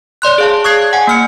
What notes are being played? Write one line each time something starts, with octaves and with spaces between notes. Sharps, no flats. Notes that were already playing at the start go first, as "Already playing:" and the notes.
C#5 D5 C6 F#6
G#4 F5 A5
C#6 D#6 F#6 G#6 C7
F#5 G#5
A#3 F6 C#7